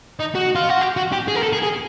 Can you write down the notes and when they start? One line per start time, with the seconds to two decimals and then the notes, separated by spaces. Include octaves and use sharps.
0.20 D#4
0.35 F#4
0.55 F4
0.69 F#4
0.81 G4
0.97 F#4
1.12 G4
1.28 G#4
1.35 A#4
1.43 A4
1.53 G#4
1.63 G#4